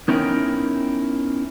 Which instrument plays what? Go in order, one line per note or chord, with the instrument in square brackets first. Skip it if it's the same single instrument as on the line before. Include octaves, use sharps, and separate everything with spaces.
[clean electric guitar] B3 C#4 D#4 E4 A#4 G5